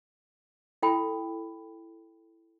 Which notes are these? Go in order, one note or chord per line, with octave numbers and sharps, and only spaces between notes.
E4 A4 G5 B5